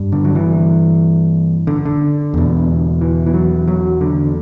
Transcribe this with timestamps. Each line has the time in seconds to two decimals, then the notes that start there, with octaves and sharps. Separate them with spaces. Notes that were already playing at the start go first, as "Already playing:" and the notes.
Already playing: G2
0.12 D3
0.25 F#3
0.35 E3
1.67 D3
1.86 D3
2.34 E2 B2
3.01 E3
3.26 E3
3.34 F#3
3.68 F#3
4.01 D3